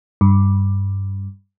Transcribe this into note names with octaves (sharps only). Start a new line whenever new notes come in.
G2